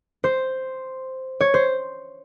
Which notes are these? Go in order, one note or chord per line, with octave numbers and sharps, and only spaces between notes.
C5
C#5
C5